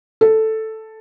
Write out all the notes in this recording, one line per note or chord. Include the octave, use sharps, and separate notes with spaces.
A4